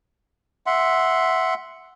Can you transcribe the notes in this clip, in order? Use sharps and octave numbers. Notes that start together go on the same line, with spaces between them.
E5 F#5 C6